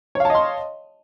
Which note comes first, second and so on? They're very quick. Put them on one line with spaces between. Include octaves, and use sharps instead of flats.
C#5 F5 A5 D#5 C6